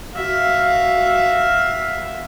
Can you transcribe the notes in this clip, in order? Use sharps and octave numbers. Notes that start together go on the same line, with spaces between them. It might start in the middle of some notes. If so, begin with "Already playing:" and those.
F#4 E5 F5